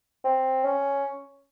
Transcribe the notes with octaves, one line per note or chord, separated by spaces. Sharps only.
C4
C#4